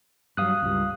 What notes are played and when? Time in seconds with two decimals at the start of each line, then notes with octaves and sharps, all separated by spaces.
0.37 G2 F#3 F5 D#6 F#6
0.62 C#2 G2